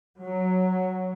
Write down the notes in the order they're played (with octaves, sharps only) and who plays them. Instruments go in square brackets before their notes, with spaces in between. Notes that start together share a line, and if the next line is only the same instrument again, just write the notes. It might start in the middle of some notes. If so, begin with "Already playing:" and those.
[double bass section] F#3